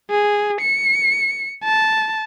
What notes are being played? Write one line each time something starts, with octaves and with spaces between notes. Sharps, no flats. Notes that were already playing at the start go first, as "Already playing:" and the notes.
G#4
C#7
A5